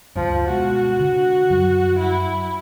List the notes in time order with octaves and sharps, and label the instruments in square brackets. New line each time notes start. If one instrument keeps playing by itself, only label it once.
[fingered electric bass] D2 G2 [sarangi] F3
[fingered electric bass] B2 G#3 [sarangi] F#4
[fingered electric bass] D3
F#2 F#3 G3
[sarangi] E4